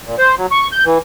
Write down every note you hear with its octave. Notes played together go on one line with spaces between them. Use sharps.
A#2
C5
F#3
C#6
G6
E3